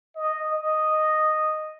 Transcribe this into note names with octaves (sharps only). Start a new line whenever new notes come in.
D#5
D#5